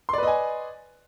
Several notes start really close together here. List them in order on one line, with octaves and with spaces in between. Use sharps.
C6 D5 B4 D#5 G#5